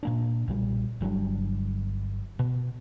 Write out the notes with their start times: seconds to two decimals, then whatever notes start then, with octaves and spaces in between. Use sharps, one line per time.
0.03 A#2 A#3 D4
0.48 B1 A#2 G3
1.01 G1 F#3 G3 D4
2.39 B2